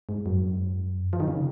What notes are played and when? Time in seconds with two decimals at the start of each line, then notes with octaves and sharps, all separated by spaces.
0.09 G#2
0.26 F#2
1.13 F3
1.20 D#3
1.28 C#3